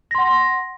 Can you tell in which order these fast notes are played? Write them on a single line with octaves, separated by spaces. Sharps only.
A#6 C6 F#5